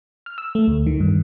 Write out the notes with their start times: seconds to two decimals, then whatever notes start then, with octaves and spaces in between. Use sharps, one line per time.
0.26 F6
0.38 E6
0.55 A3
0.68 D2
0.86 D#3
1.00 G2